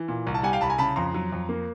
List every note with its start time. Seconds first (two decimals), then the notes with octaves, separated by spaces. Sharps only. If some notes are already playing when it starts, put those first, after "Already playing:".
Already playing: E3
0.08 A#2
0.27 C2
0.34 A5
0.43 G3 F#5 G#5
0.53 F5 G5
0.61 C2 A5 B5
0.70 G#5 A#5
0.78 C#3 A5 B5
0.96 F2 A#5 C6
1.14 F#3
1.32 F2
1.49 A#3